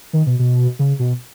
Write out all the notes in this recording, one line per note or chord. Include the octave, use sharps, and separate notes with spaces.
D#3
B2
B2
C#3
B2